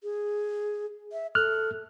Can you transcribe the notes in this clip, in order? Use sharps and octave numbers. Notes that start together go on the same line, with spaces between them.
G#4
E5
A4 F6 F#6